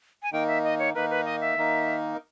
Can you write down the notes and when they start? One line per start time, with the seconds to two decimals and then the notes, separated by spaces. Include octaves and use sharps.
0.23 G#5
0.32 D#3 A#3 D#4 A#4 G5
0.48 E5
0.64 D#5
0.79 C#5
0.94 D#3 A#3 D#4 A#4 B4
1.10 B4
1.25 D#5
1.41 E5
1.56 D#3 A#3 D#4 A#4